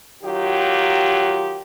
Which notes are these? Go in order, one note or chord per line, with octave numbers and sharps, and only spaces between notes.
D#3 F#3 F4 G4